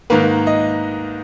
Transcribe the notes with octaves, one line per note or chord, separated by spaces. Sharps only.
G#2 D#3 A#3 B4
D#5